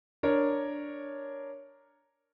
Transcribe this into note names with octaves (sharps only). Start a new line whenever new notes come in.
D4 A#4 C#5